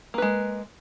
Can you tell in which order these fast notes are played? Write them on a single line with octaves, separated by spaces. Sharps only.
A#3 B4 G#3